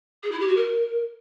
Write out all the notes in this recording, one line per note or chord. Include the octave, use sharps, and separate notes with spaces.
G#4
E4
G4
F#4
A#4